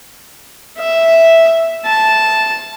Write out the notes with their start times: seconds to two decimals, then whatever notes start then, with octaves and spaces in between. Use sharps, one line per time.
0.78 E5
1.85 A5